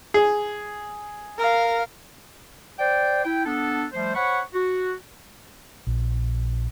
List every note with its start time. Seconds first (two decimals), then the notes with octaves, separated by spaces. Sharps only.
0.14 G#4
1.38 A#4 F5
2.79 C5 D5 G5
3.24 E4 G5
3.46 B3 D4 A4
3.94 F3 G3 A3 C5
4.14 C5 C#5 F#5 B5 C#6
4.54 F#4
5.87 A#1